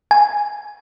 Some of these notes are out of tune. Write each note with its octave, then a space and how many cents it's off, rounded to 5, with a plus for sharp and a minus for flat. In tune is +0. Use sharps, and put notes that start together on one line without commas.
G#5 +0